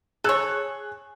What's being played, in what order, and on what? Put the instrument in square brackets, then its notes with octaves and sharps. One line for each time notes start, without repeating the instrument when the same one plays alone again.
[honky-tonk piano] G#4 F#6 [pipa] A4 C#5